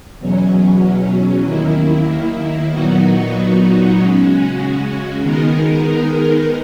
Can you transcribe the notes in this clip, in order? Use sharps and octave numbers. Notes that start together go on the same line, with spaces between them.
E2 B2 F#3 C#4
D#2 D#3 A#3 E4
A#2 F#3 B3 D#4 F#4
C#3 G#3 C#4 F#4
D#3 G#3 B3 D#4 A#4